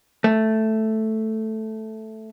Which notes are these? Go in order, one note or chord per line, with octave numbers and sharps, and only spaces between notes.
A3